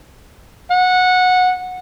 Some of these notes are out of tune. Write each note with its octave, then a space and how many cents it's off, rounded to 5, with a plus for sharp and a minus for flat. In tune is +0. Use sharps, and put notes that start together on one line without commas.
F#5 -15